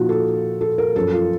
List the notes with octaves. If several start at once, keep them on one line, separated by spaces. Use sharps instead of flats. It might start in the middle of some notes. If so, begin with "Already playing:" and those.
Already playing: A#2 F3 D#4 F4 F#4
A4
A4
A#4
F#2 F3 A4
F4